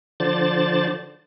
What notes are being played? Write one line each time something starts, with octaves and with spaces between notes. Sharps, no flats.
D3 F3 C5 D5 A6